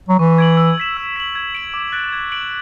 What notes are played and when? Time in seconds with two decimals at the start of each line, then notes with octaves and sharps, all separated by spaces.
0.09 F#3
0.19 E3 C#6
0.38 G#6 D7 F#7
0.57 E6
0.78 G#6 B6 E7
0.97 E6
1.16 B6 F#7
1.35 G#6
1.55 D7 F#7
1.74 D6
1.92 F#6 A6 D7
2.12 G#6
2.32 D7 F#7